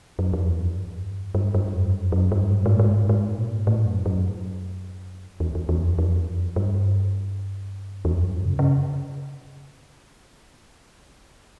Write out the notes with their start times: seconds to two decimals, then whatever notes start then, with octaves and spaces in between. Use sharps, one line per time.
0.19 F#2
0.33 F2
0.49 E2
0.63 F2
0.77 G2
1.35 G2
1.54 G2
1.74 F2
1.93 F#2
2.12 F#2
2.32 G2
2.51 G#2
2.59 A2
2.66 G#2
2.73 A2
2.79 G#2
3.09 G#2
3.38 A#2
3.67 A2
3.85 F#2
4.06 F#2
5.40 E2
5.55 E2
5.69 E2
5.83 F2
5.98 F2
6.27 F#2
6.56 G2
8.05 E2
8.13 F2
8.22 F#2
8.30 G2
8.45 C#3
8.59 C#3